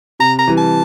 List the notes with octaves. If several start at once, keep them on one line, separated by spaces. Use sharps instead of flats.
C3 A#5
A#5
E3 G3
A5